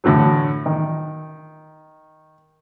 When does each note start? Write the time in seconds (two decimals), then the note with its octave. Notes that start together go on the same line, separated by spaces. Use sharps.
0.04 A2 D3 E3 F#3
0.66 D#3